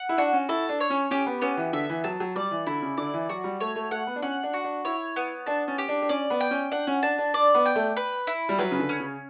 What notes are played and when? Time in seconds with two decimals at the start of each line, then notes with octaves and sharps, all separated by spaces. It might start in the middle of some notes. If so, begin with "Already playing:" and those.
Already playing: F#5
0.09 E4
0.18 D4 F#4
0.33 C#4
0.49 E4 A4
0.69 D4
0.80 C#5
0.90 C#4
1.11 C#4 G4
1.26 B3
1.42 B3 C#4
1.57 E3
1.73 D3 E5
1.89 E3
2.04 F#3 A5
2.20 F#3
2.35 G3 D5
2.51 E3
2.67 D3 E4
2.82 C#3
2.97 D3 D5
3.14 E3
3.29 F#3 F#4
3.44 G3
3.60 A3 C#5
3.76 A3
3.91 A3 F#5
4.07 B3
4.16 D4
4.22 C#4 F#5
4.43 D4
4.53 F#4
4.64 D4
4.85 E4 C#5
5.16 B3
5.46 D4 A5
5.68 C#4
5.78 G4
5.89 D4
6.02 D4
6.09 C#4 D5
6.30 B3
6.40 G5
6.51 C#4
6.72 D4 F#5
6.87 C#4
7.03 D4 A5
7.18 D4
7.34 D4 D5
7.55 B3
7.65 G5
7.76 A3
7.97 B4
8.27 E4
8.49 G3
8.59 F#3 B4
8.72 C#3
8.79 D3
8.89 C#4
9.00 C#3